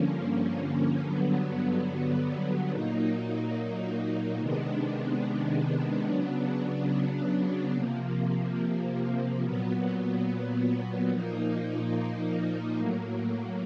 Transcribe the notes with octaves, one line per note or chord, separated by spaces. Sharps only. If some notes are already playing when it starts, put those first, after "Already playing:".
Already playing: G2 D3 F3 A#3 C#4
G2 D3 F#3 B3
A#2 F#3 A#3 D#4
C3 D#3 G#3 B3 D4
C#3 F#3 B3 D4
C3 F3 A#3
A#2 F#3 B3
A#2 F3 A#3 D#4
A2 F#3 A#3